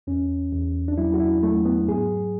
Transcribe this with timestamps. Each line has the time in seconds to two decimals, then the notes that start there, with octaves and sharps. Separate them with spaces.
0.07 E2 C#4
0.52 E2
0.88 D4
0.98 F#3 E4
1.14 F#4
1.20 E4
1.43 F#3 A3
1.65 B3
1.88 G#2 G#4